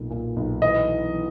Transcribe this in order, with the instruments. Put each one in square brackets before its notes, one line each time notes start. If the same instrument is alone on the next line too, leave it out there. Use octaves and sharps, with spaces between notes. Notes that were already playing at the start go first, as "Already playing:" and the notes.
Already playing: [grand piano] B1 A#2
A#2
B1
[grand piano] E3 [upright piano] D#5
[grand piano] E3
E3